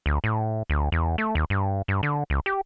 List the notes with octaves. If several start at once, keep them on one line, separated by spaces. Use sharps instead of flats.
D2
A2
D2
E2
A3
D#2
G2
G2
D3
C#2
G4